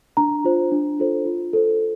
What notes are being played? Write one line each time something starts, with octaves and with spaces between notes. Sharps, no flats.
D4 A#5
F4 C5
D4
F4 A4 C5
F4
A4 C5